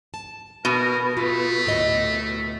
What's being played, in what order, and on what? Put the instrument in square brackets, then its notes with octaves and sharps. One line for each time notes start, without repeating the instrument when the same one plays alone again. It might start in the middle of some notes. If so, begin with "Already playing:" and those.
[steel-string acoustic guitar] A5
[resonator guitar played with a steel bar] B2 [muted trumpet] A#4
[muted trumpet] A3 [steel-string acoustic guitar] F4
[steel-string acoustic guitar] D2 A2 D#5